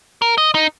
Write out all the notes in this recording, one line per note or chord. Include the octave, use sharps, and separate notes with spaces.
A#4
D#5
D#4